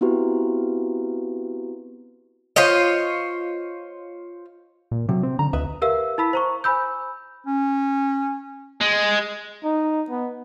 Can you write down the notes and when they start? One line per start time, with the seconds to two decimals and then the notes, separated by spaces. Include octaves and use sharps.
0.01 B3 C4 E4 F#4 G4 B4
2.56 F4 C5 C#5 D#5
4.91 A#2
5.09 C3 F#3
5.23 C4
5.39 D3 A#5
5.53 D2 B4 D#5 E5
5.82 G4 A#4 B4 E5 F5 E6
6.18 E4 A5 B5 E6 B6
6.33 C5 A#5 C#6
6.64 C5 G#5 B5 E6 G6
7.47 C#4
8.81 G#3
9.64 D#4
10.10 B3